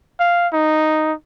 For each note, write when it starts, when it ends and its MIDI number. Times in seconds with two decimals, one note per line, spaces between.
0.20 0.48 77
0.53 1.13 63